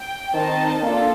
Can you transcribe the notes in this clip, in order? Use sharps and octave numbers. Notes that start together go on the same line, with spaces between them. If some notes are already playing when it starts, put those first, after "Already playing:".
Already playing: G5
D#3 C4 D#4 A#4 D#5 A5
A#3 D4 F4 A4